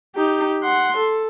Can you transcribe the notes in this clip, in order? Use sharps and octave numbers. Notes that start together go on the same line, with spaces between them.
D#4 G4
F#5 C6
A4